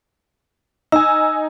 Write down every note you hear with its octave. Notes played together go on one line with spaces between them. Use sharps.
D#4 G#5 E6